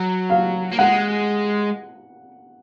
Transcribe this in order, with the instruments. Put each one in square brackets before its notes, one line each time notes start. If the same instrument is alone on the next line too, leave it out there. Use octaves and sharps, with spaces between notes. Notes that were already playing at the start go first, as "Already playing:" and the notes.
Already playing: [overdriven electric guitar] F#3
[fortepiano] F5
[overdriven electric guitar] A#3
[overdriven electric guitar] G#3 [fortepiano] F#5